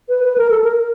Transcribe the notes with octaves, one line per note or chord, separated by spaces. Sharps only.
B4
B4
A#4
A4
A#4
A#4